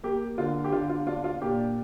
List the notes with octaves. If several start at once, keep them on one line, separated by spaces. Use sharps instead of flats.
A#3 G4
D3 F4
G4
D3 F4
F4
D4 F4
F4
A#2 G4